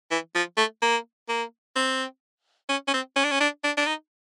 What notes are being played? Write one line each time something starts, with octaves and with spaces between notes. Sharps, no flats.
E3
F3
A3
A#3
A#3
C4
C#4
C#4
C4
C#4
D4
C#4
D4
D4
D4
D#4